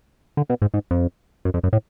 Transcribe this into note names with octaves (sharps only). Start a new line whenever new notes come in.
D3
B2
G#2
G#2
F2
F#2
F2
F#2
A2